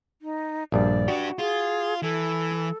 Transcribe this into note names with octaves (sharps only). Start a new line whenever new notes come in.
D#4
A#1 G2 G3 D5
D4 F#4 G4
F4 G#4
E3 A4